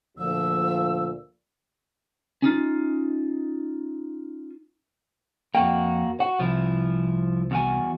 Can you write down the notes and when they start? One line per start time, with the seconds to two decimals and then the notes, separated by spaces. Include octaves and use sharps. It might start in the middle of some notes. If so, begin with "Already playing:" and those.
0.18 D2 A#2 F3 E6
2.42 C#4 D#4 F4
5.55 F2 A#3 F#4 G5
6.20 F#4 F#5
6.39 C2 F3 E4
7.51 E2 F#4 G#5